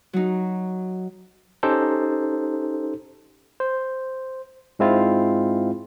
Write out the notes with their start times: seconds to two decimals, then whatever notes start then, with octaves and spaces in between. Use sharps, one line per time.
0.13 F#3 D#4
1.63 C#4 D#4 G4 A4 C5
3.60 C5
4.79 G#2 G#3 C4 E4 F4